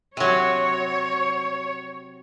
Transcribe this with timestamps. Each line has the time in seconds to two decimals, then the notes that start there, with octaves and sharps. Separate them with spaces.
0.17 C3 F#3 C#5